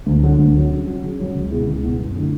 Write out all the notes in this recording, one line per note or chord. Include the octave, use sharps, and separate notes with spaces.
D2
D3 F#3
D2
D3 F#3
C#3
F#3 C#4
C#3
F#3 C#4
C#2
B2 G#3 B3 E4
C#2
B2 G#3 B3 E4
F#2
D3 A3 E4